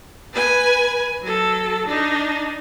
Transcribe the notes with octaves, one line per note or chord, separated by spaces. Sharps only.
B4 G#5
F#3 A4
D4 D#4